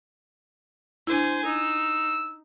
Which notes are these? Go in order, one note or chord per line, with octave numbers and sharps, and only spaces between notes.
D4 E4 C5 G#5
D#4 E6